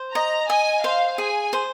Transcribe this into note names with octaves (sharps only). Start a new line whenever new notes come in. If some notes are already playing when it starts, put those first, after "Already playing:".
Already playing: C5
D#5 A#5
D#5 G#5
C5 F5
G#4 G#5
C5